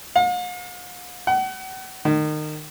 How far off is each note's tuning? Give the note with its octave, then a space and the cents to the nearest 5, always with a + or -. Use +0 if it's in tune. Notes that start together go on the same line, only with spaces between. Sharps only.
F5 +45
F#5 +35
D#3 -30